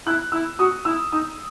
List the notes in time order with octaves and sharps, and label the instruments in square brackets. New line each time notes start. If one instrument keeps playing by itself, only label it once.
[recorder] E4 [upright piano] F#6
[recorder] E4 [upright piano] E6
[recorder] F#4 [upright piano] D#6
[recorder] E4 [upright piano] E6
[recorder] D#4 [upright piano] D#6